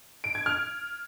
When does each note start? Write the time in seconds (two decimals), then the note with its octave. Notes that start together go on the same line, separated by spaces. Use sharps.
0.24 D7
0.35 G#6
0.46 F6